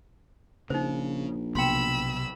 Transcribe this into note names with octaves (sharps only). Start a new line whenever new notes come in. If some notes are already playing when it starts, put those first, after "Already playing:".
A#1 C#3 D#4 C5
B1 C3 B3 G5 B5 C6 E6